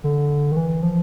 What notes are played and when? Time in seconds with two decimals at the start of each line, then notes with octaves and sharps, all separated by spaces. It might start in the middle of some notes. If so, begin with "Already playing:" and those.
0.04 D3
0.51 D#3
0.56 E3
0.83 F3